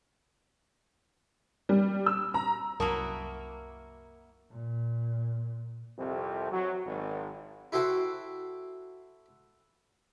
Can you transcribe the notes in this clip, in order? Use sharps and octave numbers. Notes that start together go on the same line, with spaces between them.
G3
E6
A#5
C2 F#2 A#3 E4 F#4 A#4 A5 D#6
A#2
C2 F2 C3
F#3
G#1
E4 F#4 A4 C5 G5